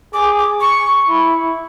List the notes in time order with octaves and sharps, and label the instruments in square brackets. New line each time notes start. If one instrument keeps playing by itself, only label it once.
[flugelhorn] G#4 [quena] D6
[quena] D6
C#6
[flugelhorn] E4